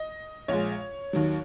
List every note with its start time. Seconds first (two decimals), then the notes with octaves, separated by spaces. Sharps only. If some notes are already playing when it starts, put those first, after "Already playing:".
Already playing: D#5
0.48 A#1 A#2 G#3 C#5
1.13 D#2 D#3 F#3